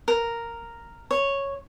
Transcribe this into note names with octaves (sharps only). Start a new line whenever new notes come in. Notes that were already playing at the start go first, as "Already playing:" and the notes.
A#4
C#5